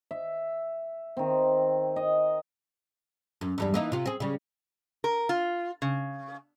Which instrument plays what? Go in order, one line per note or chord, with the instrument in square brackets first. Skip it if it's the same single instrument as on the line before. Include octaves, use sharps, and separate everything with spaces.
[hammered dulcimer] E5
D#3 C4
D#5
[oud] F#2
E2 G2 G3
E3 A#3 D#4
C3 F4
C4 G#4
C#3 G3
[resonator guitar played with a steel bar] A#4
F4
C#3